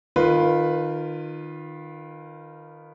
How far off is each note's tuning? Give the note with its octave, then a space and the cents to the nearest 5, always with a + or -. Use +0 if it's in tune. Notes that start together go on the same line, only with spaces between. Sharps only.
D#3 -25 F4 +0 B4 +0